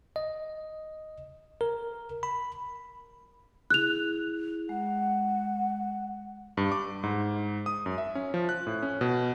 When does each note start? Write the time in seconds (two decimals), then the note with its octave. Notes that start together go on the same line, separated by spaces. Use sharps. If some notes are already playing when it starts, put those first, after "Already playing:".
0.16 D#5
1.61 A#4
2.23 B5
3.70 E4 G#4 F#6 F7
4.69 G#3 F#5
6.57 G2
6.72 D6
7.03 G#2
7.66 D#6
7.86 F#2
7.98 E5
8.15 C#4
8.34 F3
8.49 F#6
8.67 A2
8.83 C#4
9.01 B2